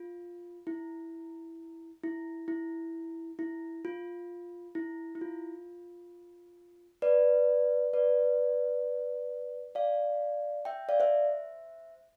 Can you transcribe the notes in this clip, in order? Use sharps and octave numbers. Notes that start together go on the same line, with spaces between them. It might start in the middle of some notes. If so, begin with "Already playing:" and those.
Already playing: F4
E4
E4
E4
E4
F4
E4
E4
F4
B4 D5
B4 D5
D5 F5
E5 G5
D5 F5
C5 E5